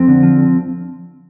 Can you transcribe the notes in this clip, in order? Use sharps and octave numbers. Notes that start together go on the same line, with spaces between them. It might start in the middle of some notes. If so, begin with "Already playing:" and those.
Already playing: F2 C4
D3
F3
F2